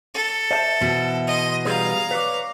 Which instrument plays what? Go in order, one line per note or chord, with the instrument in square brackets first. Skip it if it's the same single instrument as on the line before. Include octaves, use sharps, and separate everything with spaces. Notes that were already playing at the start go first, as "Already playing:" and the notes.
[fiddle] A4
[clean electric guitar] C5 E5 A5
[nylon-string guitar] B2 E3
[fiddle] D#5 C6
[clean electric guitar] G3 G#4 B4 [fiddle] F5 A#5
[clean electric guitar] B4 C#5 D5